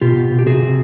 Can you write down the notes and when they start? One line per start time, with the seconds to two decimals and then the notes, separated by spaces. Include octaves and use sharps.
0.01 B2 F4 G4
0.16 B2
0.31 B2
0.39 G4
0.46 C3 F#4 G#4
0.62 C3